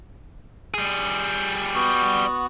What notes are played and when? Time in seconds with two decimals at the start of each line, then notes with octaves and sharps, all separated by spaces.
0.74 G3 G#4
1.74 B3 F#4